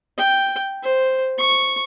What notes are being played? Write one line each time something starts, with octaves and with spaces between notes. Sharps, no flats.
G5
C5
C#6